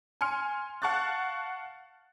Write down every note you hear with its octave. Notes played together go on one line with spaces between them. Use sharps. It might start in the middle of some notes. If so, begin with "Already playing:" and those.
G#5 C6 F6 C#7
F5 F#5 A5 C#6 F#6 A6